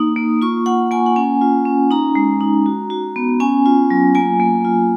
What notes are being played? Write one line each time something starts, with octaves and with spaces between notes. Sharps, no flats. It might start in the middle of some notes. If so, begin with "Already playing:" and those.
Already playing: A#3 D#4 D#6
A#3
F4 C#6
F4 F#5
A#3 G#5
F#5
C#4 G#5
F4
C#4
D#4 A#5
G#3
D#4
F#4
F#4
B3
C#4 G#5
F4
F#3
A#3 G#5
A#3
F4